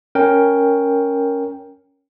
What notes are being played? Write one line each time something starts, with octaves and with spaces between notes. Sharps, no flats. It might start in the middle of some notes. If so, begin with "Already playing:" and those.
C#4 A#4 G5